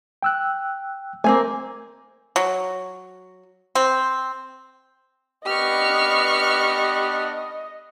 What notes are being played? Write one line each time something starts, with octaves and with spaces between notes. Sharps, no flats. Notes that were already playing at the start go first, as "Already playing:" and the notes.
G5 E6 F#6
A3 A#3 C4 G#5
F#3
C4
B3 D4 G4 B4 D#5 C#6 F6